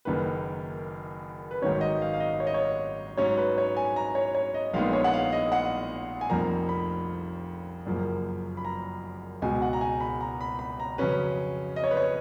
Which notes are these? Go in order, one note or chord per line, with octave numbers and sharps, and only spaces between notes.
F#1 F#2 D#3 A#3 B4
B4
G#1 G#2 D#3 F#3 C#4 C#5
D#5
F5
F5
D#5
C#5
D#5
C#5
G#2 F#3 C#4 C#5
B4
C#5
G#5
A#5
C#5
C#5
D#5
A#1 A#2 G#3 B3 D#4 F5
C#5
F#5
F5
D#5
F#5
G#5
F1 F2 F3 A#3 A#5
B5
F#1 F#2 F3 A#3
B5
A#5
C#2 B2 G#3 G#5
F#5
A#5
G#5
B5
A#5
B5
B5
A#5
F2 C#3 F#3 C#4 B4
D#5
C#5
B4
C#5